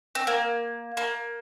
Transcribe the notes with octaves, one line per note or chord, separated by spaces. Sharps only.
C4
A#3
A#3